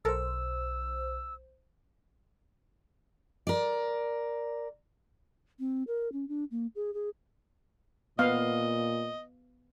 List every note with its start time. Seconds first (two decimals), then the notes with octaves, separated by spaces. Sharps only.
0.05 B1 A4 A#4 C5 E6
3.47 A#4 D5
5.59 C4
5.87 A#4
6.12 C#4
6.29 D4
6.51 A#3
6.76 G#4
6.94 G#4
8.19 A#2 B3 D#5 F5